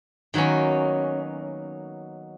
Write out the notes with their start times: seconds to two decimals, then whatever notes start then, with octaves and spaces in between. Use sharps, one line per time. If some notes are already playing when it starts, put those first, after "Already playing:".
0.34 D#3 F#3 A#3 B3 C#4